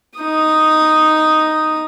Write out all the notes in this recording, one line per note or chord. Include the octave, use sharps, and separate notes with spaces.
D#4 D#6